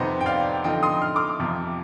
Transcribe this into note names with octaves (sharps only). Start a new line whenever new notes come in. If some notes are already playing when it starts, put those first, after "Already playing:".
Already playing: F2 C3 D#3 B3 D#4 C5 D#5
G5
D5 F5
D3 F3 C4 D#4 D#5 G5
C6 D#6
F6
D6 F6
F2 C3 F3